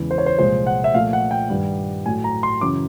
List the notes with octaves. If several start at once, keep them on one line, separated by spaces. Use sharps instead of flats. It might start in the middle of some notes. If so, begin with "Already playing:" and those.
Already playing: E2 C#3 E3 G#3
C5
C#5
C5
C2 A#2 F3 G#3 C5
F#5
E5
A#2 F3 A3 F5
F#5
G5
G2 D#3 G3
A2 F#3 A3 G#5
A#5
C6
F#2 C#3 E3 D6